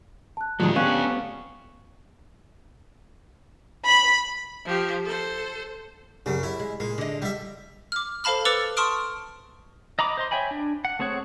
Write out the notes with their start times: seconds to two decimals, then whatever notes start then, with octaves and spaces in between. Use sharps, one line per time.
0.37 A5 F#6
0.60 A2 D#3 F3 F#3 G#3 A3 D4
0.76 B3 C#4 G4 F5 C#6 F#6
3.86 B5
4.65 F3 G4
5.05 A4 C5
6.26 F#2 C#3 G3
6.43 F#2 E4
6.60 G#3
6.80 A#2 G#3
6.98 D3 D#5
7.22 G3 E5
7.92 D6 F6
8.24 A4 C5 F5 A5 B5 F6
8.45 B4 D6 E6 A6 C#7 F7
8.77 A5 C6 C#6 D#6 F6 D7
9.99 D#5 A#5 B5 D6
10.17 C5 D#5 C6
10.31 C#5 E5 G5 G#5 B5
10.51 D4
10.85 F#5
10.99 A3 C4 G#4 C#5 F#5